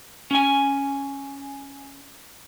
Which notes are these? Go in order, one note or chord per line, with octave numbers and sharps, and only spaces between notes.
C#4 G#5